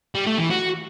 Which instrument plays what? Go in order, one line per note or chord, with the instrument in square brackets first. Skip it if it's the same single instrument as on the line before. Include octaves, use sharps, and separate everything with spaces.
[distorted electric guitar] G3
A3
E3
F#4